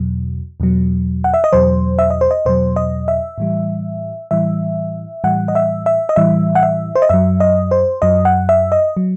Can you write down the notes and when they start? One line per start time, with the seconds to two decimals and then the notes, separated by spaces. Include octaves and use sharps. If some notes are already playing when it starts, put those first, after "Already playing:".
Already playing: E2 B2 F#3
0.60 E2 B2 F#3
1.24 F#5
1.34 E5
1.44 D#5
1.53 E2 B2 F#3 C5
1.99 E5
2.10 D#5
2.21 C5
2.31 D#5
2.45 E2 B2 F#3 C5
2.76 D#5
3.08 E5
3.38 A2 E3 G3
4.31 A2 E3 G3 E5
5.24 A2 E3 G3 F#5
5.48 D#5
5.55 E5
5.86 E5
6.09 D#5
6.16 A2 E3 G3 E5
6.55 F#5
6.63 E5
6.95 C5
7.02 D#5
7.09 F#2 F#3 E5
7.40 D#5
7.71 C5
8.02 F#2 F#3 D#5
8.25 F#5
8.49 E5
8.72 D#5
8.97 F#3